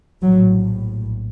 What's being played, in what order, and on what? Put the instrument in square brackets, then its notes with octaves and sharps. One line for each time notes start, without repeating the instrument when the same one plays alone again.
[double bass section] A#1 A2 F#3